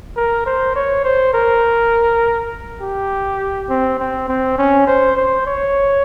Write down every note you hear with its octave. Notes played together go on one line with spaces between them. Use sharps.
A#4
C5
C#5
C5
A#4
G4
C4
C4
C4
C#4
C5
C5
C#5